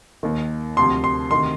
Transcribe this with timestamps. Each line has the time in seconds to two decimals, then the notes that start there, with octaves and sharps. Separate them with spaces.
0.23 D#2 D#3
0.77 D2 C3 F3 C6
1.04 C6
1.31 D2 C3 D#3 C6